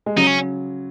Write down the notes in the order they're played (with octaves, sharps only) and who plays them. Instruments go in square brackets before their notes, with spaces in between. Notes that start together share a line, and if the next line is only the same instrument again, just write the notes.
[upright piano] G#3
[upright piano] C#3 F#3 [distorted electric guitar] D#4
[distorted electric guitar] C#4